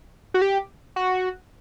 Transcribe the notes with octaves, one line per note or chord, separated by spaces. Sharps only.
F#4
G4
F#4